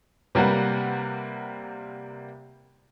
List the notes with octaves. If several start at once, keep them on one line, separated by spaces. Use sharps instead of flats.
C3 G3 A#3 B4 F#5